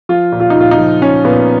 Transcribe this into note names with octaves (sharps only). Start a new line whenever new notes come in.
F3 F4
A#2
F4
D#4
A#2
F4
D#4
F3
F3 C#4
A#2 B3